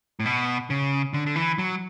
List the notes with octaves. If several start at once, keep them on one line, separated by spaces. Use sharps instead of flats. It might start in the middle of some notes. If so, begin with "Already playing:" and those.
A2
B2
C#3
D3
D3
E3
F#3